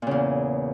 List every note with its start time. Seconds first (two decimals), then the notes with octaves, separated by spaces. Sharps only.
0.02 A#2
0.07 C#3
0.11 E2